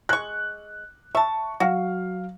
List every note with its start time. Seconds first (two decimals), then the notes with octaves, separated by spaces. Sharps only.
0.09 G#3 C#6 F#6
1.15 E5 A5 C#6
1.60 F#3 F#4 F5